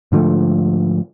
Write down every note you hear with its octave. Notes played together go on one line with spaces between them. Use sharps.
G#2 D3 F3 A3